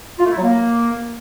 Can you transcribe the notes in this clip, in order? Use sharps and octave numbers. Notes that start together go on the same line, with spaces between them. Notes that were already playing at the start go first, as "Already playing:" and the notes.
F4
A3
E4
F#3
A#3